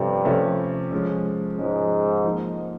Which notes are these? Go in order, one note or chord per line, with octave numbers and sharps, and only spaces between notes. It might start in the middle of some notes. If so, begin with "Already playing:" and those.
Already playing: G2 C3 F3 A3 C#4
C3 F3 A3 C#4
F3 G#3 C#4
G#2 F3 G#3 C#4
F3 A#3 D#4